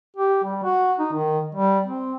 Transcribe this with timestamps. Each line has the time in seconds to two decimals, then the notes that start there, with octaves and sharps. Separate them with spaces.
0.16 G4
0.44 G3
0.63 F#4
0.99 D#4
1.13 D#3
1.55 G3
1.86 C4